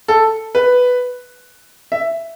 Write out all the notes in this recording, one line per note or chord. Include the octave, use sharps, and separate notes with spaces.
A4
B4
E5